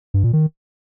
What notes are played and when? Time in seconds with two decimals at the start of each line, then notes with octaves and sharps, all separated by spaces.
0.14 G2
0.24 A#2
0.33 D#3